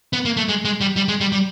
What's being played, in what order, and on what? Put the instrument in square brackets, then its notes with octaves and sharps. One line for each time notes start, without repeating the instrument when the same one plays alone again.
[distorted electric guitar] B3
A#3
A3
G#3
G#3
G3
G3
G#3
G3
G3